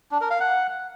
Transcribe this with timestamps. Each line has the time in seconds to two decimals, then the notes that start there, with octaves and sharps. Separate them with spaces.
0.11 D4
0.21 A#4
0.30 F5
0.40 F#5